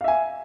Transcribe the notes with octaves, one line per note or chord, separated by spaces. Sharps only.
E5 F5 G#5